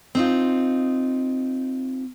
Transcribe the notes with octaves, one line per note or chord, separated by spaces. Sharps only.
C4 D#4 F4